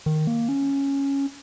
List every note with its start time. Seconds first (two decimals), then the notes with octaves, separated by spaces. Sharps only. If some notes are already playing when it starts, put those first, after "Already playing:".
0.06 D#3
0.27 A#3
0.49 C#4